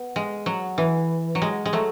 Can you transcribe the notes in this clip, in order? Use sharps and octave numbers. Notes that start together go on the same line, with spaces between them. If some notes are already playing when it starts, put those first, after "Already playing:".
Already playing: B3
G#3
F#3
E3
F#3
G#3
G#3
F#3 A3